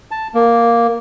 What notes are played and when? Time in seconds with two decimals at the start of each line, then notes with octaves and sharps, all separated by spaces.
0.11 A5
0.34 A#3